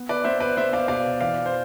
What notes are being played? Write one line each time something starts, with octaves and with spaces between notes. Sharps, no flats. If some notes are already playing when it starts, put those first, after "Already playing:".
Already playing: B3
B4 D5
B3 C5 E5
B4 D5
B3 C5 E5
D5 F5
B2 D5 F5
E3 D5 F5
C5